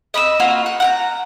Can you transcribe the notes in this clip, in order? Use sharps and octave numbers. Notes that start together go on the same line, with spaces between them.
D#5 B5 D6 E6
A#3 F4 F#4 B4
F#5
F#5 G5 A#5